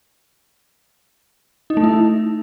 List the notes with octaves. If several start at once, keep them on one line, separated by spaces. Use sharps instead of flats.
D#4
A3
E4